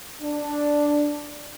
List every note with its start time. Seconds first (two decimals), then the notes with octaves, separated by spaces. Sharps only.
0.22 D4